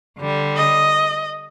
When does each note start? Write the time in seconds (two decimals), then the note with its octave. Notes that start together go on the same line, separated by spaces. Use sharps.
0.18 D3 G3
0.56 D#5